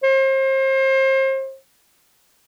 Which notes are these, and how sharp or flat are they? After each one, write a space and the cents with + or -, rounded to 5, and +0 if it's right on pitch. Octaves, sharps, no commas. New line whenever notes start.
C5 +35